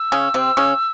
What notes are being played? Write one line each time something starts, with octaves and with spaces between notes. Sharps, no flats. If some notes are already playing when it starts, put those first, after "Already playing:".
Already playing: E6
C#3 C#4
C3 C4
C#3 C#4